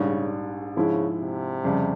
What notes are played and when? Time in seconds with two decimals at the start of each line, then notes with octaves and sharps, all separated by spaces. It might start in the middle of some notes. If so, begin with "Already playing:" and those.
Already playing: A#1 G#2 C#3 G3
0.76 G#2 C#3 F3 G#3 E4
1.20 C3
1.64 F2 C#3 G3